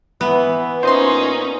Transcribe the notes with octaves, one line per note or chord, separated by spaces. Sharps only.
E3 B3
A#2 C#4 D#4 C5 D#5 C6